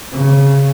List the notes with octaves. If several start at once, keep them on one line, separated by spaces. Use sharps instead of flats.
C#3